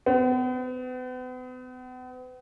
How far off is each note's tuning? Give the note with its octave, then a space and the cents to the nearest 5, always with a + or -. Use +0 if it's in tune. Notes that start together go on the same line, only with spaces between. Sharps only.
B3 +40